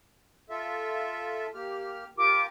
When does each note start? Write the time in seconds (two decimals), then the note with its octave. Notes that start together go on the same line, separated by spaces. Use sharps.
0.50 F4 A4 E5
1.54 A#3 G4 F6
2.18 F4 G4 A#4 D6